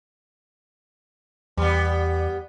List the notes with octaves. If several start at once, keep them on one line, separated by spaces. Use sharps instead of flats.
E2 G3 B3